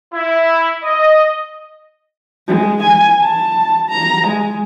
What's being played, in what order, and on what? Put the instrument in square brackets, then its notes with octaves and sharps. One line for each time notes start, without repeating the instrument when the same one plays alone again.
[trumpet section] E4
D#5
[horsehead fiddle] G#3
G#5
A5
A#5
G#3